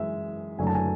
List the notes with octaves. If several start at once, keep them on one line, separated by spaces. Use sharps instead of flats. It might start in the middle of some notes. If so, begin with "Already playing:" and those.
Already playing: F#2 E3 G#3 E5
F#1 F#2 D3 F#3 A3 G#5
A5
G#5